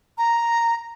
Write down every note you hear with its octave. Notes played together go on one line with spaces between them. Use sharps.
A#5